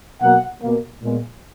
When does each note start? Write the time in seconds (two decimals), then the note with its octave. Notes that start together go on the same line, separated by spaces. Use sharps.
0.21 B2 F#3 A#3 F#5
0.62 B2 A#3
1.02 A#2 G#3 B3